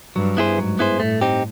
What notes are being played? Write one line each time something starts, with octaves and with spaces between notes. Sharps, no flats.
G2 F#3
B3 E4 G#4 C5
G#2 F#3
B3 E4 G#4 C5
A2 A3
C4 D#4 G4